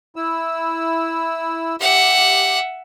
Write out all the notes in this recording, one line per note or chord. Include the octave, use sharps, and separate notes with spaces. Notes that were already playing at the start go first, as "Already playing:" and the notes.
E4 E6
G4 E5 F#5